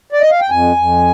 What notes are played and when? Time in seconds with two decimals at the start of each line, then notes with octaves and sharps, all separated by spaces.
0.13 D5
0.21 D#5
0.31 F5
0.41 G5
0.50 F2 G#5
0.76 F2